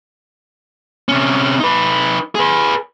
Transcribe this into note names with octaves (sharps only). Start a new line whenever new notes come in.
C3 C#4
D#4 B4
G#4 B4